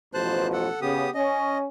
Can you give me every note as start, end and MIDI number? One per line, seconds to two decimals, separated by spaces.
0.14 0.67 33
0.14 0.67 47
0.14 0.67 53
0.14 0.47 72
0.14 0.47 81
0.14 0.47 90
0.53 0.80 69
0.53 0.80 78
0.82 1.04 49
0.82 1.10 59
0.82 1.10 67
0.82 1.10 87
1.14 1.68 61
1.14 1.58 75